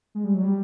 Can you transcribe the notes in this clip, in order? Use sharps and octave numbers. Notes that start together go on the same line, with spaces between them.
G#3
G3
F#3
G3